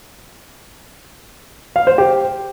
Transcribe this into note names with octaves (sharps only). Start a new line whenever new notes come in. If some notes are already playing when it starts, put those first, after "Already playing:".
F5
C5
G4